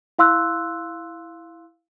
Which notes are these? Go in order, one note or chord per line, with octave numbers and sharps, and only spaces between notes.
E4 F5 C6 E6 F#6